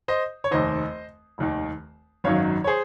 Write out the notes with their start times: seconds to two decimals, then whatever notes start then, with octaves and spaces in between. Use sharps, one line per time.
0.08 C5 D#5
0.44 C#5
0.51 F1 D#2 D#3 C5 D#5
1.38 F1 D#2 D#3
2.24 G#1 F#2 D#3 F#3 C#5 F5
2.64 C#5
2.67 G#4 C5